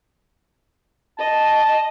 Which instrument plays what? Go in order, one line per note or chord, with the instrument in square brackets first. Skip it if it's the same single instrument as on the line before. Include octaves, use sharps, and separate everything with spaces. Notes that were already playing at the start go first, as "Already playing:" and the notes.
[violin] D#5 [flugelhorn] A5